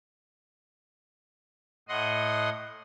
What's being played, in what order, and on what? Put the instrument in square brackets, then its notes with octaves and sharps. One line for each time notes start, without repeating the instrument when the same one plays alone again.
[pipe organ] A2 D#5 F#5 C6 D#6